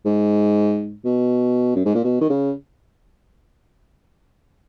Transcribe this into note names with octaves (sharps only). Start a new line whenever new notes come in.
G#2
B2
F#2
G#2
A#2
B2
D#3
C#3